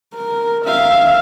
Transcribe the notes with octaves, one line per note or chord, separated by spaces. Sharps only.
A#4
E5 F5